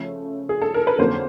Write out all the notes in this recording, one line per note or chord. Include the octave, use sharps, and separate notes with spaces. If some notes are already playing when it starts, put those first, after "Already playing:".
Already playing: C#3 F3 A3 C#4
G#4
A4
A#4
B4
F2 D3 F#3 A#3 C#4 C5